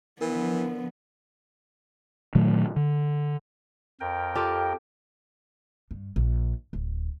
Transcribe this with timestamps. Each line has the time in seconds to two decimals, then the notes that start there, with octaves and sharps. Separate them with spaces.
0.21 D3 E3 F3 B3 A#4
2.35 A#2 D#3 F#3 A3
2.76 D3
4.00 F2 A#4 G5
4.35 F4 G4 A4
5.91 G2
6.16 A#1
6.73 D1